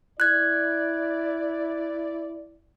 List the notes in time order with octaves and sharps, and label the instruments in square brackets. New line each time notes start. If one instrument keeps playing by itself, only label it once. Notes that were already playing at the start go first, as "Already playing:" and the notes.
[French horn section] E4 D5 [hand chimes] F#6 G#6